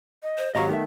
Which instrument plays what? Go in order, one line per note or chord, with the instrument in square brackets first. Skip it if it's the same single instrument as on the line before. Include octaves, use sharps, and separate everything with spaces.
[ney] D#5
[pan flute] C5
[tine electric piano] G#1 F#3 [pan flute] G4 [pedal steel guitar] D#5 A#5 C#6 [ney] F5
[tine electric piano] D#3 [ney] A3 [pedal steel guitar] B3 E5